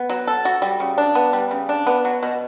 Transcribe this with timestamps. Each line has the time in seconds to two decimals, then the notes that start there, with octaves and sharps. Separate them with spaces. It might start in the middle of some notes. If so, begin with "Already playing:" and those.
Already playing: B3
0.10 F#3
0.28 A4
0.45 F#4
0.62 G3
0.80 C#3
0.98 D4
1.15 B3
1.33 G3
1.51 C#3
1.69 D4
1.87 B3
2.05 F#3
2.23 B2